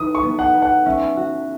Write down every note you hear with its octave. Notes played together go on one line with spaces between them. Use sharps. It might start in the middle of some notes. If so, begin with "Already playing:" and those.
Already playing: E3 D#4 B4 D#6
C#6
B3
F#5
B4
F#5
C#4 E5
F#4